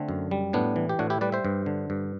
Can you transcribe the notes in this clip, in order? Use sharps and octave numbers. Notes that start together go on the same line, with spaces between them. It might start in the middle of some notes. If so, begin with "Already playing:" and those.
Already playing: D3 A3 C4
F#2
G3
A2 B3 D4
E3
G4
A2 D4 F#4
E4 G4
G3 B4 D5
C5 E5
G2
D3
G2